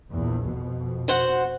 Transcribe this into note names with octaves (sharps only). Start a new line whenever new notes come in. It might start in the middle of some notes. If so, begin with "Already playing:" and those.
A#1 E2
F2 B2
F#4 C5 F#5